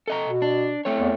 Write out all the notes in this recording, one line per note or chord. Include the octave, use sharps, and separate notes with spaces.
A4 D#5 A#5
B2
D4
A3 C4 C#5
E2